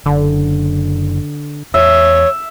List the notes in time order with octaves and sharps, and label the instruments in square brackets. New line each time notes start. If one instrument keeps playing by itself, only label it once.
[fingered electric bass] F#1 [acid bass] D3
[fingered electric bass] E2 [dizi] C#5 [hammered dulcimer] E5